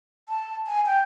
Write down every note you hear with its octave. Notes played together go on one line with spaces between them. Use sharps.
A5
G#5
G5